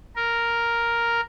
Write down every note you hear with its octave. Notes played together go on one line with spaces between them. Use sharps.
A#4